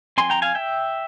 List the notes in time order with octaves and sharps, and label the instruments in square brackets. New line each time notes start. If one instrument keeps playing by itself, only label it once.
[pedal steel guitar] F3 C4 G#5 C6
G5 A#5
F5 G#5
E5 G5